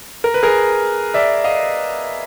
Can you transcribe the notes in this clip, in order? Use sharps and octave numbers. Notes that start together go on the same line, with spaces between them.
A#4
B4
G#4 A#4
D5 E5
D#5 F5